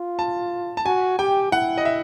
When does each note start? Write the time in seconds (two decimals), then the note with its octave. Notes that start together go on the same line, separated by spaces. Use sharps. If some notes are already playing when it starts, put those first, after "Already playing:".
Already playing: F4
0.19 A5
0.77 A5
0.86 F#4 G#5
1.19 G4 G5
1.52 E4 F#5
1.78 D#5
1.85 E5